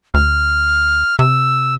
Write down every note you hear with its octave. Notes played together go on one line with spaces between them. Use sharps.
D2 F6
C3 E6